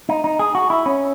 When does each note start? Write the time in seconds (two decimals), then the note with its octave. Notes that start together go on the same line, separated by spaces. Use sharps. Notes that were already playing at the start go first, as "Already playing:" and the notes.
0.09 D#4
0.24 D#4
0.39 G#4
0.55 F#4
0.70 E4
0.86 C#4